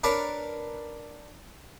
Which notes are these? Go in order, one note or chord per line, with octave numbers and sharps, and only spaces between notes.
D4 A#4 B4 C#5 A5